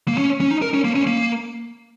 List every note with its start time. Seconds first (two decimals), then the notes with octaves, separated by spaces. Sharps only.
0.08 A#3
0.18 C#4
0.41 C#4
0.51 D#4
0.62 A#4
0.74 C#4
0.85 A#3
0.96 C#4
1.07 A#3